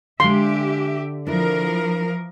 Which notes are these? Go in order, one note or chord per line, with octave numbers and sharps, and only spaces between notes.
D3 G#3 G4 A4 E5 F5 C6
E3 F3 D4 E4 A#4 B4